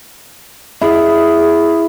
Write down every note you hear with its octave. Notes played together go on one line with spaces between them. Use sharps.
E4 G#4